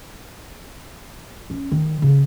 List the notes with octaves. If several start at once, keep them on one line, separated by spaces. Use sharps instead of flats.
C#4
D#3
C#3